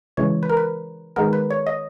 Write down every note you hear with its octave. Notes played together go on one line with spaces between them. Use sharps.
C#3 E3 G#3 C#5
B4
A#4
B4
D#3 G#3 B3 A#4
B4
C#5
D#5